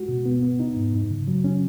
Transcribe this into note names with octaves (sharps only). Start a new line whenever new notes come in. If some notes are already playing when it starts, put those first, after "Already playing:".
Already playing: G#3 F#4
B2
B3
B3
D#4
G#2
F#2
C#3
F#3
C#4